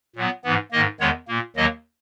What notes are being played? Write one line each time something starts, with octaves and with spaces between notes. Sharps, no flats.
A#2 F#3 B3
G#2 E3 B3
G#2 D#3 A#3 D#5
E2 D#3 G#3 B3 C#5
A#2 A#3
D#2 D#3 F#3 A#3 D#5